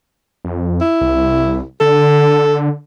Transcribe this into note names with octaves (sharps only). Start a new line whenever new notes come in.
F2
E4
C2
D3 A4